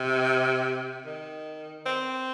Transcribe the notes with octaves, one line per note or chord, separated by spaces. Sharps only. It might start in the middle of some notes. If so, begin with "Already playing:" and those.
Already playing: C3
D#3
C4